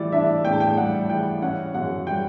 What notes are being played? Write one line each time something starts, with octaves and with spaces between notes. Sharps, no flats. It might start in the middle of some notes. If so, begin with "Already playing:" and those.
Already playing: A2 E3 G3 D5
D4 E5
A2 G5
A5
G5
G3 F#5
E3 G5
C#4 F#5
F#2 F#5
G3 G5